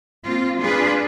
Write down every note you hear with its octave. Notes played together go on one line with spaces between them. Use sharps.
A#3 C4 F4
D4 F4 G#4 B4